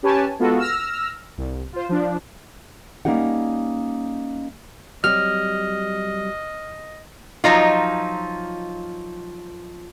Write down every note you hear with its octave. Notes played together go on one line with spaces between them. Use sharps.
C#4 G4 B4 C#5 G#5 A5
G#3 B3 F4 F#4 A4
E6 F6 A#6
C2
F4 C5
F3 D4
G3 A#3 C#4 D#4 G4 F#5
F#3 G3 C4 D#5 F6
F3 F#3 D#4 F4